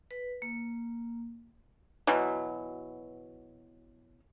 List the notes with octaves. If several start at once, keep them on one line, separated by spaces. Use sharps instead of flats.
B4
A#3
B2 E3 F#3